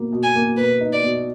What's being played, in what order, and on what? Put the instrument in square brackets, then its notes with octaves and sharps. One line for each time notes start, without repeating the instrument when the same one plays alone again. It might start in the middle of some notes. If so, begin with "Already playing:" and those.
Already playing: [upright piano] B2 A#3
B2
[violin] G#5
[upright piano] A#3
[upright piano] B2 [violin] B4
[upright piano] D#4
[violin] D5
[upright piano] B2